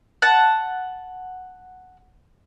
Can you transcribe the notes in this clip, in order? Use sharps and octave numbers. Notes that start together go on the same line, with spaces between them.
F#5 A5